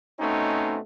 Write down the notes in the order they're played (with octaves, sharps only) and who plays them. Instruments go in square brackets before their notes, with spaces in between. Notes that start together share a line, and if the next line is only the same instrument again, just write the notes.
[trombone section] B2 A3 C4 C#4 D#4